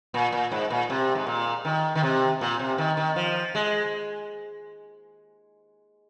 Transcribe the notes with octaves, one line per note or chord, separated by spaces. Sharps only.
A#2
A#2
G#2
A#2
C3
G#2
A#2
D#3
D#3
C3
A#2
C3
D#3
D#3
F3
G#3